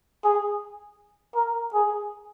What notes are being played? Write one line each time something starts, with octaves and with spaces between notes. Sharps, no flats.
G#4
A#4
G#4